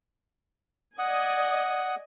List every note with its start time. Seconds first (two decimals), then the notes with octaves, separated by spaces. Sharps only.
0.99 D5 D#5 F#5 G#5 D#6